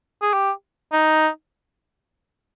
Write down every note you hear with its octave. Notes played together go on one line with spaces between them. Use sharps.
G#4
G4
D#4